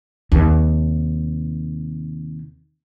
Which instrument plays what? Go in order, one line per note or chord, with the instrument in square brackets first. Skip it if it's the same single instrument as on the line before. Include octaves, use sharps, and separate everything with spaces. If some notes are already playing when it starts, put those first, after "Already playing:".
[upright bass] D#2 C3